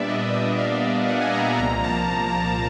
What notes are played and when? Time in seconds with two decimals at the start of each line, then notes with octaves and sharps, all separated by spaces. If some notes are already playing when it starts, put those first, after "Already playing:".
Already playing: A#2 G3 B3 D4 D5 E5
0.09 D#5
0.34 E5
0.59 F5
1.09 F#5
1.21 G#5
1.33 A#5
1.47 A#5
1.59 C2 A#2 F3 A#3 A#5
1.84 A5